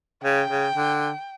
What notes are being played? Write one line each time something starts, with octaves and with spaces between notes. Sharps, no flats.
C#3 G5
C#3
D3